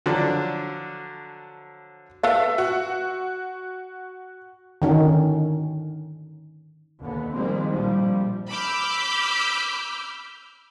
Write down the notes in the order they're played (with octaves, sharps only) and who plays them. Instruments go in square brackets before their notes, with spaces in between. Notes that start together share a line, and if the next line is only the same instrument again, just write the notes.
[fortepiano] D3 F3 F#3 D4
[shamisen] A4 B4 F5 [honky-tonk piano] E5
[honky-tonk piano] F#4
[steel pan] D3 D#3 C#4
[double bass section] D#2 D3 B3
D#3 F3 G3 G#3 A#3 C4
A#1 F3 G3
[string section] B5 D6 E6 F6 G6